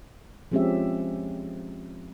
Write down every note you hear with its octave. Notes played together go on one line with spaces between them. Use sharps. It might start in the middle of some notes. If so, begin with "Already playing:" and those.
F3 G#3 C4 C#4 G4 E5